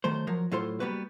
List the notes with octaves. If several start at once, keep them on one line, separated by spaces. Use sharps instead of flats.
D#3 F#3 A3 C5
F3 F#3 A#4
A2 F#3 F4 A4 C5 C6
G3 A#3 B3 F#4 B4